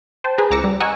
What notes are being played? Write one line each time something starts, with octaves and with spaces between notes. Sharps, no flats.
C5 G5 A5
G#4 B4 A#5
C#2 A#5 D6 E6 A#6 C#7
G3
D#5 F#5 G#5 A#5 C#6 E6